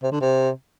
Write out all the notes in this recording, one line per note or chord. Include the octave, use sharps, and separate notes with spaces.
C3
D3
C3